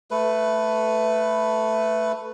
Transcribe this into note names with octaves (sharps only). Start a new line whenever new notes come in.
A3 B4